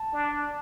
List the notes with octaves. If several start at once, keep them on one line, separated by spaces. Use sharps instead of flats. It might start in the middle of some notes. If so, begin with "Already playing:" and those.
Already playing: A5
D4